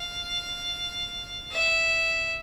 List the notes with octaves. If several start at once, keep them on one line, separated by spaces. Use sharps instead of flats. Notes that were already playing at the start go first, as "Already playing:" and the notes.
Already playing: F5
E5